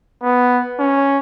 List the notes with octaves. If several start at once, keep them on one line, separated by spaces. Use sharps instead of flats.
B3
C#4